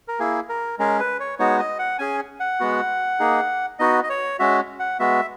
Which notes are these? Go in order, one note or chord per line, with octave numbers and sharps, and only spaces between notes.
A#4
A#3 E4 G#4
A#4
G#3 C#4 G#4 A#4
B4
C#5
G#3 B3 D#4 F#4 C#5
D#5
F#5
C#4 G#4 G#5
F#5
G#3 B3 F#4
A#3 D#4 G#4
B3 D#4 F#4 D#5
D#5
C#5
G#3 C#4 F#4 E5
F#5
G#3 B3 F#4 E5